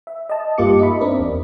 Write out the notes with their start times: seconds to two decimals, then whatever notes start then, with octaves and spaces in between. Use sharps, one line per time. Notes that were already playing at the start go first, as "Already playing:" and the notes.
0.07 E5
0.30 D#5 A5
0.58 G2 A#3 F4 G4 D6 C#7
0.79 D#4 D#5 E5 B5
1.00 C4 D4 A#4 D5
1.20 E2